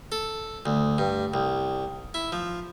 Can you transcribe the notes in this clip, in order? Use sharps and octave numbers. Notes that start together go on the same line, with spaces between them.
A4
D2
G2
C2
E4
F3